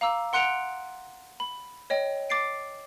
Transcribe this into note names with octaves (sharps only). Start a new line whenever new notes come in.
F5 A#5 D6 E6
F#5 C6 F#6 C#7 D7 F7
B5
C#5 D#5 G5
D6 A6 C7 D7